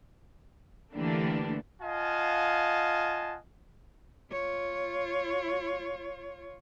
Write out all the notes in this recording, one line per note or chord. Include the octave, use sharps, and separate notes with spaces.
D3 E3 A3 A#3 D4 G4
F4 D#5 F5 F#5 G#5 A5
F4 C#5